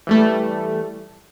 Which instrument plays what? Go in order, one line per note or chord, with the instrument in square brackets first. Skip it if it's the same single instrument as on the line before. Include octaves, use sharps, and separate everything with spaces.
[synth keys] E3 G3 A3